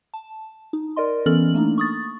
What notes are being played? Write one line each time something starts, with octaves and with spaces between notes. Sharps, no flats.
A5
D#4
A#4 D5 D#5 C6
E3 B3 C#4 A4 F6 F#7
A3 A#3 D4 D#4
C#6 D#6 A6